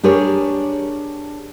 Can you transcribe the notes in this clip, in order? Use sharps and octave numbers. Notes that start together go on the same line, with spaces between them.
D4 G4 G#4 A#4 C#5